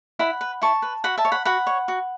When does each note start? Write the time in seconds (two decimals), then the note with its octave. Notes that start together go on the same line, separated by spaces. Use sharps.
0.19 E4 F#5 B5
0.41 B4
0.62 E4 A5 C#6
0.82 B4
1.04 F#4 F#5 B5
1.18 E5 A5
1.25 C#5
1.32 F#5 B5
1.45 F#4 F#5 B5
1.67 C#5
1.88 F#4